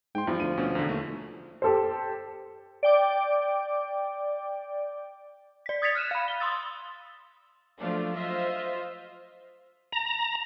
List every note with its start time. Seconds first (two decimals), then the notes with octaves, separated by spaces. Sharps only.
0.15 G#2 G5 C6
0.27 E2 G2 F3
0.40 D2 D#7
0.58 D2 B2 C#4
0.75 E2 D3
0.89 D#2 A3
1.62 G4 A4 C5
2.83 D5 G5 D6
5.66 D5 B6
5.82 D#6 G#6 A6 B6 C#7 F7
5.95 F6 F#6 D#7 E7
6.11 F5 B5
6.28 G7
6.40 C6 D#6 E6 A6
7.80 F3 F#3 A3 D4 F4 C5
8.15 F4 C5 D#5 E5
9.92 A#5